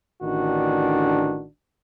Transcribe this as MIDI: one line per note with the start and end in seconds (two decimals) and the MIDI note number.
0.23 1.46 33
0.23 1.46 50
0.23 1.46 51
0.23 1.46 62
0.23 1.46 66